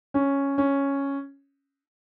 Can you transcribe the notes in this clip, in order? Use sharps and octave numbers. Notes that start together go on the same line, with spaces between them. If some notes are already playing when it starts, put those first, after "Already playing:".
C#4
C#4